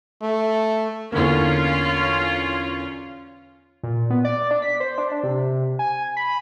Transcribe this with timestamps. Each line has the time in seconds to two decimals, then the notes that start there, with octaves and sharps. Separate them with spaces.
0.22 A3
1.12 E2 D3 A#3 C#4 F4
3.83 A#2
4.10 B3
4.25 D5
4.51 D4
4.62 B6
4.80 C5
4.98 D4
5.11 D4
5.23 C3
5.79 G#5
6.17 B5